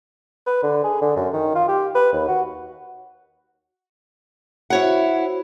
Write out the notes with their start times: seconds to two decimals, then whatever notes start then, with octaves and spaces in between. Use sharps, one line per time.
0.46 B4
0.63 D3
0.84 G#4
1.02 D3
1.16 F#2
1.33 D#3
1.55 F4
1.68 G4
1.95 B4
2.13 D#2
2.28 F#4
4.70 E4 F#4 C5 C#5 F#5 B5